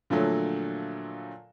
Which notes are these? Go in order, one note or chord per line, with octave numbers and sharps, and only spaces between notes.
A#2 D3 F3 F#3 A3